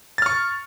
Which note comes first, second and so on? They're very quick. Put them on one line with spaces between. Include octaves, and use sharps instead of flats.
A6 F6 C#6